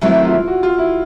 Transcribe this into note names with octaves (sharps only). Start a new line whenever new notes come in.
C3 D#3 F#3 A3 C4 E4
F4
F#4
F4
E4